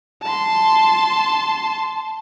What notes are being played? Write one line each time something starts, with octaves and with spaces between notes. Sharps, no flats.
A5 C6